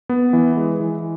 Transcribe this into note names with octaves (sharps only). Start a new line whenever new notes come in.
B3
E3
G#3
E3